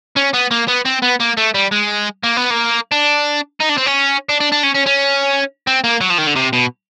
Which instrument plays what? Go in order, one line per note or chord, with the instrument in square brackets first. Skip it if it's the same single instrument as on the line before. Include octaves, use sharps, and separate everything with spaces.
[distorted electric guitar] C#4
B3
A#3
B3
C4
B3
A#3
A3
G3
G#3
A#3
B3
A#3
D4
D#4
D4
C4
C#4
D4
D4
D4
C#4
C#4
C#4
C4
A#3
F#3
F3
D#3
D3
C3
B2